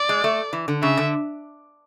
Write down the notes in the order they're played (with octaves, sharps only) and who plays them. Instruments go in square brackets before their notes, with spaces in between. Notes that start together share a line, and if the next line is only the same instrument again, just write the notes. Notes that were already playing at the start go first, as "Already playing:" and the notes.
Already playing: [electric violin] D5
[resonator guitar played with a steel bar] G#3
A3
E3
D3
[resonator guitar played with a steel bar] C#3 [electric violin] E5
[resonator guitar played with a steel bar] D3